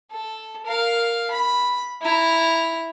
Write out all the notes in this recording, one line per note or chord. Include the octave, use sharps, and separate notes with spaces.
A4
A#4 F5
B5
E4 A#5